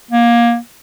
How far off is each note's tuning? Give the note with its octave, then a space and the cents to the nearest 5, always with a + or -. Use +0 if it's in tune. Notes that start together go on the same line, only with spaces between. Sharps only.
A#3 +20